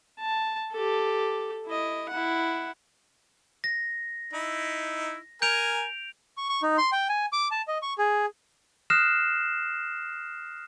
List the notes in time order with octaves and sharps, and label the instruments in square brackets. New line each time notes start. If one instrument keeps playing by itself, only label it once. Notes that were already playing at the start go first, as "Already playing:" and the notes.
[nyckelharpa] A5
G4 A4
E4 D#5
E4 F#5
[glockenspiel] A#6
[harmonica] D#4 E4
[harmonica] A#4 G#5 [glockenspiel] G6 D7 F7
[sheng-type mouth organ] C#6
C#6
D#4
C6
G5
G#5
D6
A5
D#5
C#6
G#4
[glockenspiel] D#6 F6 F#6 A#6 C7 E7